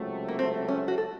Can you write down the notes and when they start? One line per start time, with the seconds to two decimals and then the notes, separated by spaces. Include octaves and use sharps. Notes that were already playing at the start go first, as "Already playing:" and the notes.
Already playing: C#2 C3 F#3 A3
0.28 A#3
0.39 C4
0.69 C#4
0.88 F#4
0.98 A4